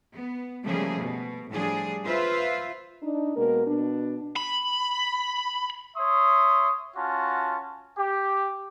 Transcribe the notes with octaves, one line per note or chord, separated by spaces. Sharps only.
B3
C#3 F3 G3 A3 A#3 G#4
B2
A2 F3 G3 D4 G#4
F4 B4 C5 E5 F5
D4 D#4
B2 G#3 A#3 A#4
B2 D4
B5
C#5 E5 C6 D#6
C#4 F4 F#4 A5
G4